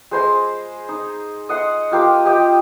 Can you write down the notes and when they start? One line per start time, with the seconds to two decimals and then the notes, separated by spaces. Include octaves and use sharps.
0.11 G#3 C5 C6
0.89 D#4
1.49 D#5 F#5 C6
1.91 F4 G4 A#4
2.25 G4 D#5 G5